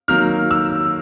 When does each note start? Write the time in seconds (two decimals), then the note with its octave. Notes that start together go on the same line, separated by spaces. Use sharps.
0.08 D#3 F#3 A#3 F6
0.51 E6